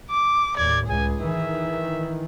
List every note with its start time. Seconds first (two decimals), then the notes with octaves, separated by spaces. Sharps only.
0.11 D6
0.57 D#2 A2 D5 G#6
0.89 C#2 G#4 G#5
1.21 D#3 E3 E5